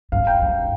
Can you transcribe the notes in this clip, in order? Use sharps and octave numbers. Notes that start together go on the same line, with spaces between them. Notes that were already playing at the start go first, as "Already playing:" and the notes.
G2 F5
G5
G2